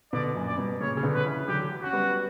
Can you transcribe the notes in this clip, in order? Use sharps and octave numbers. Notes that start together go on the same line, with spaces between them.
B2 D3 D5
F#2 A#2
D5
G2 B2
A#2 C#3 C#5
C#3
B2 D3
B4
C#3 E3
D3 F#3 G4
C#4 F#4
G3 B3